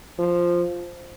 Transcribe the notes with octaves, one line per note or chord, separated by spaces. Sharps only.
F3